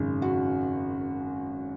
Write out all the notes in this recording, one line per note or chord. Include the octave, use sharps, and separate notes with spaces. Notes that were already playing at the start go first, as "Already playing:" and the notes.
Already playing: G#1 F#2 C#3
F#4